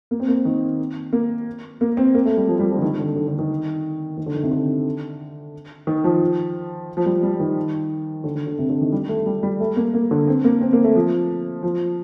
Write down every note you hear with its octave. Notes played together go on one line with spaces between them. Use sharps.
A#3
C4
A#3
D#3
A#3
A#3
C4
A#3
A3
G3
F3
G3
F3
D3
D#3
D3
D3
D3
D#3
D#3
D3
D#3
C3
D3
D#3
F3
F3
G3
G3
D#3
D3
D3
D3
C3
D3
D#3
G3
A3
G3
G3
A3
A#3
A#3
D3
C4
A#3
C4
A#3
A3
F3
F3